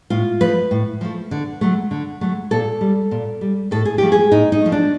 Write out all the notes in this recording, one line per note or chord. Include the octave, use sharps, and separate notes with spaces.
A2 F4
F3 A3 B4
A2
F3 A3
D3
F#3 A3
D3
F#3 A3
A#2 A4
G3
A#2
G3
A2 A4
G#4
F3 A3 G4
G#4
A2 D#4
D#4
F3 A3
D4